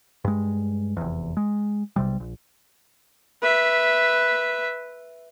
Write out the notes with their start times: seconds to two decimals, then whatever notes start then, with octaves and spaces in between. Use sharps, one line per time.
0.25 G2 G#3
0.97 F1 E2
1.37 G#3
1.96 B1 C3 G3
2.20 A#1
3.42 B4 E5